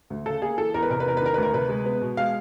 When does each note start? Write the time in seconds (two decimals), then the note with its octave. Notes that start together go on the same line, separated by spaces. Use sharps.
0.10 D2
0.26 C#3 A4
0.42 A#3 G#4
0.58 E3 A4
0.74 E2 A#4
0.82 B4
0.90 C3 A#4
1.00 B4
1.06 E2 A#4
1.17 B4
1.22 D#3 A#4
1.34 B4
1.38 D2 A#4
1.53 C3 B4
1.69 G#3
1.86 B3
2.01 B2
2.17 G#3 F5